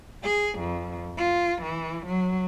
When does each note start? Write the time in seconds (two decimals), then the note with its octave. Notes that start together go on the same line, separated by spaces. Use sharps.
0.23 G#4
0.59 F2
1.17 F4
1.62 E3
2.07 F#3